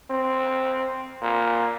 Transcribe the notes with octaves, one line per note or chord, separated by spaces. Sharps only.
C4
A#2